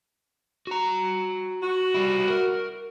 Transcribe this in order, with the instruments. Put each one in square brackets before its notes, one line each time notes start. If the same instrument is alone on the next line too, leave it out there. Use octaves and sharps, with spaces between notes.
[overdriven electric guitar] F#4 A#5
[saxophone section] F#4
[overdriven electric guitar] G3 E4
A#4